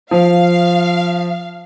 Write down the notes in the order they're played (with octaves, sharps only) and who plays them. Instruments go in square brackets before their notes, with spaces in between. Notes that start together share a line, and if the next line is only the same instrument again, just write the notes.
[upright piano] F3 [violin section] F5